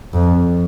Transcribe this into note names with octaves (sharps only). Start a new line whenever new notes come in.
F2